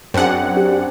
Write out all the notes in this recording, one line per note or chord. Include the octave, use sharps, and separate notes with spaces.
F#2 C4 D4 G#4 F#5
G4 D5